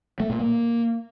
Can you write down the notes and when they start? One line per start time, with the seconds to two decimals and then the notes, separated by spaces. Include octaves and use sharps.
0.20 A3
0.30 A#2
0.39 A#3